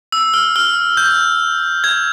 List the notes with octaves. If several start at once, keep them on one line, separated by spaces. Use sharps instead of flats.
E6
F6
F6
G6
G#6